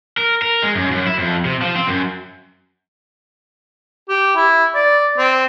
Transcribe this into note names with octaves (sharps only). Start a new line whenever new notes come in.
A#4
A#4
G#3
F#2
F#2
E4
F2
C3
F3
C4
F#2
G4
E4
D5
C4